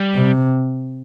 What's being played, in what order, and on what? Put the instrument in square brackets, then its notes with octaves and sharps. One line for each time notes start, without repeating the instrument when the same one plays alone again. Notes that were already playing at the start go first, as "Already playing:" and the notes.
Already playing: [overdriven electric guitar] G3
[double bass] C3